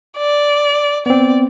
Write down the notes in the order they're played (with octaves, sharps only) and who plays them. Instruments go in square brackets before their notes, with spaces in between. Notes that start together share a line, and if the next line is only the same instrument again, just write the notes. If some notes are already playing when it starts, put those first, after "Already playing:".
[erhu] D5
[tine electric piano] B3 C4 [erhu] D5